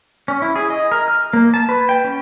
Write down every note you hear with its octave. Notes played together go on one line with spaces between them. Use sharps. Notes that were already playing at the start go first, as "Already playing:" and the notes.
C#4
E4
G#4
D#5
A#4
F6
A#3
A5
B4
G5
C#4